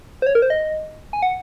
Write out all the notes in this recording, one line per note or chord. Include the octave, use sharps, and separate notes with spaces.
C5
C#5
A#4
C5
D#5
G#5
F#5